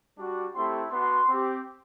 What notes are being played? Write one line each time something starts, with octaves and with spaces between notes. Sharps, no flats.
G3 D4 F#4
A3 C4 E4 G4 C6
B3 D4 F#4 C6
C4 G4